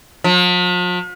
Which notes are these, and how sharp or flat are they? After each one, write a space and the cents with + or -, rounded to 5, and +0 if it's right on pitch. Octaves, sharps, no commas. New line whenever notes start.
F3 +45